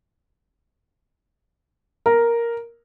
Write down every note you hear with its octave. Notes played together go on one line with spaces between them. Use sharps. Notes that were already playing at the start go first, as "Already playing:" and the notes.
A#4